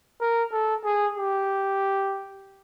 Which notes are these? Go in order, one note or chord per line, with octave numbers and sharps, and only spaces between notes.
A#4
A4
G#4
G4